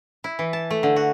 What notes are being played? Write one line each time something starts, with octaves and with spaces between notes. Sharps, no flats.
E4
E3
A5
A3
D3
F#4